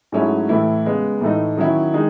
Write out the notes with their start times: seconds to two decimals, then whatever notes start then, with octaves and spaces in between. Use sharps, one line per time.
0.12 G#2 F#3 A3 C#4 E4
0.49 A2 E3 A3 E4
0.85 C#3 G#3 B3
1.21 A2 E3 A3 D#4
1.57 D#3 F#3 C#4 E4
1.94 D#3 G#3 D#4